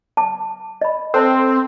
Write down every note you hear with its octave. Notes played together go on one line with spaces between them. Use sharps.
A5 D6
D#5 B5
C4 A4 C5 A5